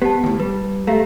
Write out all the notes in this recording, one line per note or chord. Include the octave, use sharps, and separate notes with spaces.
B3 G4 A5
D#2 A2
G3 B4
A3 G4 F5 A#5